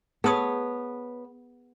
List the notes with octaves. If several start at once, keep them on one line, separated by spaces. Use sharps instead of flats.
B3 G#4 A4 B4 C#5 D#6